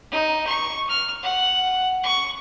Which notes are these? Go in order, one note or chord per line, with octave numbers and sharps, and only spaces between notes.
D#4
C#6
F6
F#5
C#6